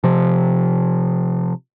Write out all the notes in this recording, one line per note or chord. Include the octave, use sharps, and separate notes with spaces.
C3 F3